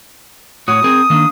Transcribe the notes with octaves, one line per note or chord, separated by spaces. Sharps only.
A2 F#4 C#5 D#6
C4 G#4 A#4
D#3 A#3 D4